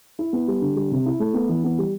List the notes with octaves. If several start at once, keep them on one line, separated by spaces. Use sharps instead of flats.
E4
B3
G3
D3
G3
C3
E4
A3
B3
E3
B3
G3